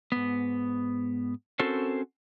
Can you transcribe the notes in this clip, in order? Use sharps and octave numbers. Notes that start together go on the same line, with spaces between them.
G#2 B3
C4 C#4 F#4 A4 A#4 C5